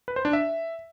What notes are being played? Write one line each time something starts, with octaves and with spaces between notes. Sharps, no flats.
B4
C5
D4
E5